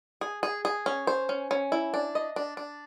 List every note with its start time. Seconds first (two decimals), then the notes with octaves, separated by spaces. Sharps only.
0.21 G#4
0.43 G#4
0.65 G#4
0.86 C#4
1.07 C5
1.29 C#4
1.51 C#4
1.72 E4
1.94 D4
2.15 D#5
2.36 D4
2.57 D4